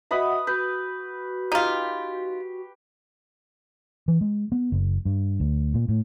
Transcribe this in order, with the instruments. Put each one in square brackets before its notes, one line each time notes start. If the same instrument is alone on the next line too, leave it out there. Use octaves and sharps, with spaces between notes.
[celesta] F#4 D#5 E5 [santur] B4 B5 D#6 [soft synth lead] F#5
[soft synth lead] F#4 [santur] B4 [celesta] G6
[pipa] D#4 F4 [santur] G4
[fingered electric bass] E3
G#3
B3
F#1
G2
D2
A#2
A2